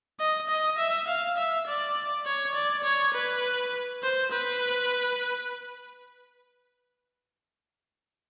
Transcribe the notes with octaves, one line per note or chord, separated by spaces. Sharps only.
D#5
D#5
E5
F5
E5
D5
C#5
D5
C#5
B4
C5
B4